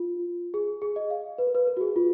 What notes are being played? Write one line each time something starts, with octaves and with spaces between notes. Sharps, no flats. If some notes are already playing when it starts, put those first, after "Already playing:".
Already playing: F4
G#4
G#4
D#5
F5
B4
A#4
B4
A#4
F#4
G#4
F4